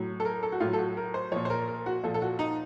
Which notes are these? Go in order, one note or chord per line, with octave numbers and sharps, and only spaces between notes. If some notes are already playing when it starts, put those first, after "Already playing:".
Already playing: A2 F#3
A4
A#4
A4
F#4
A2 F#3 F4
A4
F#4
A#4
C5
A#2 F3 C#5
C5
A#4
A#4
F#4
A#2 F3 A4
A4
F#4
D#4